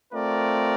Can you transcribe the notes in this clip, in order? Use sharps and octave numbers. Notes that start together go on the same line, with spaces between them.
A3 C4 F4 A#4 D5